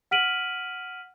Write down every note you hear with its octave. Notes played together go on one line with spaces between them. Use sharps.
F#5 F6 B6 D7 D#7 F#7